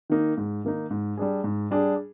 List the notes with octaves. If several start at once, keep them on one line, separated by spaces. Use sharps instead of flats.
D#3 A#3 D#4
G#2
D#3 A#3 D#4
G#2
G3 D4 G#4
G#2
G3 D4 G#4